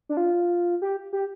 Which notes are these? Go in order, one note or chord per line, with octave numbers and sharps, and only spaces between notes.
D4
F4
G4
G4